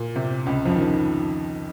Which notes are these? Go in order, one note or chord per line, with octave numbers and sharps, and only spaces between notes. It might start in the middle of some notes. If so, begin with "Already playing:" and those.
Already playing: A#2
C3
C#2 C#3
F2 F3
D#3